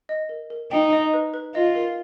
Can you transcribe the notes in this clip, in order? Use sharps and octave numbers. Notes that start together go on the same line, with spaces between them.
D#5
A#4
A#4
D#4 G5
D#5
B4
B4
F4 D#5
A#4